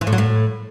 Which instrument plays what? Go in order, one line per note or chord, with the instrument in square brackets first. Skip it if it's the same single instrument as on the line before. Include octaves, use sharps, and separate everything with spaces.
[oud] E3
A2
F#3
A2